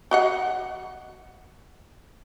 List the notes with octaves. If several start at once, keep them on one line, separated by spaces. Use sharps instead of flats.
F#4 D#5 F#5